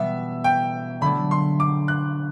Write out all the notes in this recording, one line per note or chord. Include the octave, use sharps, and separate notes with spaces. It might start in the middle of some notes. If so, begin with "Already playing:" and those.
Already playing: B2 E3 G3 B3 E5
G5
D3 F#3 A3 D4 B5
C6
D6
F#6